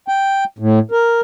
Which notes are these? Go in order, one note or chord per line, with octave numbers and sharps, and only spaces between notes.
G5
A2
A#4